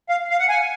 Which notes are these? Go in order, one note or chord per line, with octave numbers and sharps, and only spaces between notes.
F5
F5
F#5
G#5